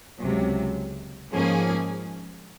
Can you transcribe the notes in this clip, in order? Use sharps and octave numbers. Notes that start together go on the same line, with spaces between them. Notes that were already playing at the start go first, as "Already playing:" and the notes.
C#2 C3 F#3
G#2 F3 A#3 C#4 G#4